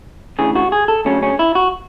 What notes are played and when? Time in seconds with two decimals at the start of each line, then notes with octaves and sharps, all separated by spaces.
0.39 D2 C#3 E3 G#4
0.56 F#4
0.72 G#4
0.88 A4
1.05 D2 C#3 F#3 C#4
1.22 C#4
1.39 E4
1.55 F#4